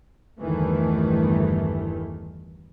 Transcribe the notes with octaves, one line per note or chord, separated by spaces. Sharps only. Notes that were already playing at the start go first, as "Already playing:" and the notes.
G1 E2 D#3 E3 A3